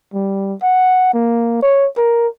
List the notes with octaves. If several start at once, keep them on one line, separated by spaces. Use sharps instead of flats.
G3
F#5
A#3
C#5
A#4